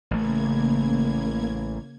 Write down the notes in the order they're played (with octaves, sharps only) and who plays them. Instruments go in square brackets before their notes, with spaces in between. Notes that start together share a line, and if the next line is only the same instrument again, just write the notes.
[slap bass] A1 A3 [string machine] C#3 A#3 G#6